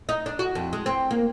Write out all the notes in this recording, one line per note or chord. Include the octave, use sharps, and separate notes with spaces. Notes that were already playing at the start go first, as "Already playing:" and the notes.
D#4
D4
F#4
F2
G#3
C4
A#3